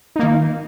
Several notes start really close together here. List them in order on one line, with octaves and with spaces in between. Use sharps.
D#4 A#3 D#3